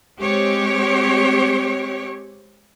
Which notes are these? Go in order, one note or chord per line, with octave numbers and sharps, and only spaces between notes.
G#3 C4 G4 C#5